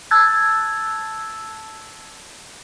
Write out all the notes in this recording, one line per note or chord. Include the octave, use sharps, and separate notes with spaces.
A5 E6 F#6 G#6 A6